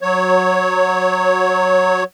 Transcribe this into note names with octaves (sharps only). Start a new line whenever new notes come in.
F#3 C#5